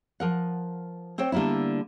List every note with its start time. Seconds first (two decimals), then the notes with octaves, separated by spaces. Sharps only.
0.20 F3 A#4 F#5
1.18 C4 C5 C#5 G5
1.32 D3 G3 A#3 B3 E4